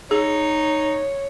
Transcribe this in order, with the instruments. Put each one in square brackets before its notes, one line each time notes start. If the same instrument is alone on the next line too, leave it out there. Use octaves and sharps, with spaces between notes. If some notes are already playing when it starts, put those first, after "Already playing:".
[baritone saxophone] D#4 [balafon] G#4 [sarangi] C#5